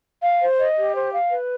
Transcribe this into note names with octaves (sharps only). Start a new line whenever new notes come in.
F5
C5
D#5
G4
C5
F5
B4